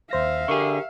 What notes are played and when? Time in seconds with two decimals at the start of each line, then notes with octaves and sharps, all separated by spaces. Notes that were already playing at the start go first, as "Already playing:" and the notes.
0.11 D#2 C5 E5 F5 A#6
0.48 D3 G4 G#4 A#4 C#6